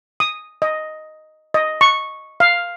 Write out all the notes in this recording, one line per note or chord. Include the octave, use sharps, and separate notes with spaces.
D#6
D#5
D#5
C#6
F5